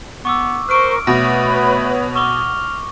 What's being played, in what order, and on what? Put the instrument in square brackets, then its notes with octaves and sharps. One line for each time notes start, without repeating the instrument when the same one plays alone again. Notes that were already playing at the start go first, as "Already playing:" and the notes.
[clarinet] B3 [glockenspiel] C#6 D6 E6
[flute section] A#4 C#6 D6 [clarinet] C5 [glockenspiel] F6 D7
[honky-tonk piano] B2 [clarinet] A3 [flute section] B4 C#5 B5 [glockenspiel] A#6
[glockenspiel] C#6 D6 G7 [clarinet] F6